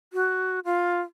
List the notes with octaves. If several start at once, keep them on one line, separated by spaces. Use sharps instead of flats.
F#4
F4